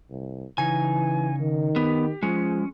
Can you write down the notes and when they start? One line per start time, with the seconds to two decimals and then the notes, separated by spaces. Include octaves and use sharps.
0.11 C2
0.58 C#3 E3 D#4 G#5
1.40 D#3
1.76 B3 G4
2.23 F3 G#3 C#4